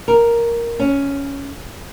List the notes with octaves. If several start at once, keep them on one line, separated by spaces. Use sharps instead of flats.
A#4
C#4